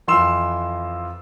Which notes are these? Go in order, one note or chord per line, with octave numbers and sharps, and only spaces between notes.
F2 E3 F4 C6 E6 E7